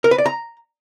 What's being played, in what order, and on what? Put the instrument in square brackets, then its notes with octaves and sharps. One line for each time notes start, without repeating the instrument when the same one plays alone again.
[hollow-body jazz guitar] A#4
B4
D5
A#5